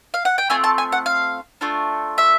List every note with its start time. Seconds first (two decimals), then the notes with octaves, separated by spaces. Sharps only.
0.14 F5
0.25 F#5
0.38 G5
0.50 A3 C4 F4 G#5
0.64 A5
0.78 G#5
0.92 F#5
1.06 F5
1.61 A3 D4 F4
2.18 E5